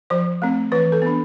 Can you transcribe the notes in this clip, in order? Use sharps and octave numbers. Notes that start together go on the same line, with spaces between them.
F3 C5
A3 C4
E3 B4
A4
B3 D4